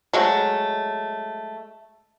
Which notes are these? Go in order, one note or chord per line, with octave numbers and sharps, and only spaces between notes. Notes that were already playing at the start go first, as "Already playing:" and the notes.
F#3 G#3 A3